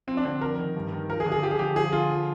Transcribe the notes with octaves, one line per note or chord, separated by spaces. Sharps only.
F3 C4
D4
D3 C4
F2 A#4
D#3
G2
D#3
F3 A#4
G#4
D3
G#4
F3 G4
G#4
D3 G4
F3 G#4
D3 F4
F3